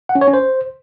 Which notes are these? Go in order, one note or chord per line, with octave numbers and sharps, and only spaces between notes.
F#5
C#4
C#5
C#4
C5